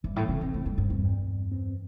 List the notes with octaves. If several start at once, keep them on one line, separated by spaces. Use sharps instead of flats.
G2 E3
A2
C3 C4
C3
A2 A3
G2
G2 C4
E2
G2
G2
C4